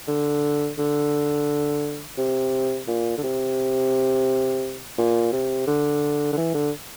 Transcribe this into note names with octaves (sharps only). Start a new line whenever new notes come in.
D3
D3
C3
A#2
D3
C3
A#2
C3
D3
D3
E3
D3